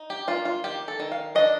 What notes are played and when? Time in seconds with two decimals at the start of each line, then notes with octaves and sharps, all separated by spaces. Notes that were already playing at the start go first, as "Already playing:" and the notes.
Already playing: D#4
0.10 G4
0.28 A#3 F4
0.45 F4
0.64 D#3 G4
0.88 A4
1.00 D#3
1.12 F5
1.35 D4 D#5